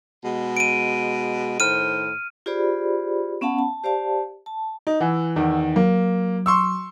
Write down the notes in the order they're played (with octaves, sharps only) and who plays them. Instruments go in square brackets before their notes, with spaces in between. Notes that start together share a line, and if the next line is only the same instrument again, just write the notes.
[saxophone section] B2 G#3
[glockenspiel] D7 D#7
[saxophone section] A2 D#3 C5 [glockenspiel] F6 D#7
[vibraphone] F4 G4 G#4 C5 D5 B5
B3 C#4 F5 F#5 A5 B5
A5
G4 C5 D5 F5 A5
A5
[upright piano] D#4
[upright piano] E3 [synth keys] F#5 G#5 E6
[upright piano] E2 D#3
[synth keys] F#3 [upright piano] A#3
[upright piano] C6 C#6 E6